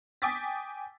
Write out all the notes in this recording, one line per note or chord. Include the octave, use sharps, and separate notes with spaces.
G5 G#5 D6 D#6 A6 B6